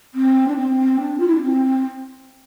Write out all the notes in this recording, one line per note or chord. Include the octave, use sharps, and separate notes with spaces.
C4
D4
C4
D4
F4
E4
D4
C4